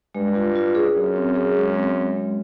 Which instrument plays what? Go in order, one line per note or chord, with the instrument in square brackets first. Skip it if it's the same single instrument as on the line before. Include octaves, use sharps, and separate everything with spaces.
[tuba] G2 [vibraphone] G#3
[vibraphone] F4
F4
G#4
[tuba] F#2 [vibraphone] G#4
[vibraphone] C4
G#4
G#3
C4
G#3
G#3